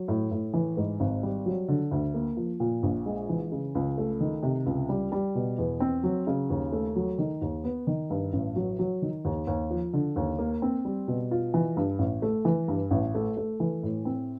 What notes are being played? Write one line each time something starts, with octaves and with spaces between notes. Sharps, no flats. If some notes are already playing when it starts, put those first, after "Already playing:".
Already playing: F#3
A2
A2
E3
G#2
G#1
G3
F#3
D3
D2
A#3
F3
A#2
A#1
G#3
E3
C#3
C#2
A3
D#3
C3
C#2
G3
G3
B2
E2
C4
F#3
C#3
D#2
A3
F#3
D#3
D#2
B3
D#3
G2
A1
F#3
F#3
D#3
D#2
D#2
F3
D3
D#2
A#3
C4
G3
B2
F4
E3
G2
A1
A3
E3
G2
A1
A3
A3
E3
A2
C4